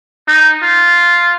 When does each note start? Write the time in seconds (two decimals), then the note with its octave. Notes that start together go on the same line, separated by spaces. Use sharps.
0.28 D#4
0.63 F4